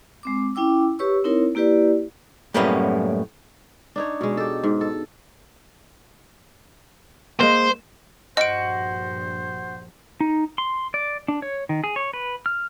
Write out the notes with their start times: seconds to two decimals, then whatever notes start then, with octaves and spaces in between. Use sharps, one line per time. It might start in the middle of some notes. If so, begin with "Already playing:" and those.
0.23 G#3 C4 D6
0.55 C#4 E4 G5 D6 E6
0.99 G4 B4 C#5 C#6 E6
1.24 C4 D#4 E4 A#4 C#5
1.55 A#3 E4 G4 B4 D5
2.54 F#2 A2 G3 A#3 B3 C#4
3.96 D4 D#4 C#5
4.21 B2 G#3
4.37 G4 A4
4.64 G#2
4.81 A4
7.41 G#3 A#3 C5
8.37 A#1 G2 F#4 C5 D#5 D7
10.21 D#4
10.58 C6
10.94 D5
11.28 D4
11.42 C#5
11.69 D#3
11.84 G#4
11.96 C#5
12.13 B4
12.46 F6